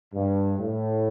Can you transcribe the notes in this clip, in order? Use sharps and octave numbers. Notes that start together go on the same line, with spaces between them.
G2
A2